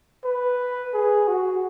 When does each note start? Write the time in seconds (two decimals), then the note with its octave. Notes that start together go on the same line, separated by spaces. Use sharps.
0.24 B4
0.93 G#4
1.27 F#4